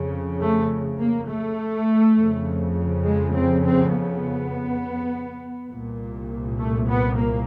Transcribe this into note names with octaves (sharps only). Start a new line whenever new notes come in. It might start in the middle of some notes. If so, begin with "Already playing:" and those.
Already playing: F2 C#3
A3
A#3
A3
F2 C#3
G#3
C4
C4
B3
C2 A#2
A3
B3
A#3